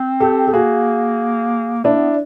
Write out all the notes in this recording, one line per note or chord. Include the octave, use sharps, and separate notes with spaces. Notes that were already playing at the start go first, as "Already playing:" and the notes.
Already playing: C4
G4 A4
A4
A#3 F#4 G#4
A#3 D4 E4
B3